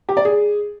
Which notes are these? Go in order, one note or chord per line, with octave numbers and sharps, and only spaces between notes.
G4
D5
G#4